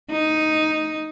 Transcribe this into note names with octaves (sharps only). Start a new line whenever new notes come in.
D#4